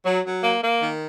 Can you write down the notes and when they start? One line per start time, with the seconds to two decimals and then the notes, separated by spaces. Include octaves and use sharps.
0.06 F#3
0.24 F#3
0.43 A#3
0.63 A#3
0.82 D#3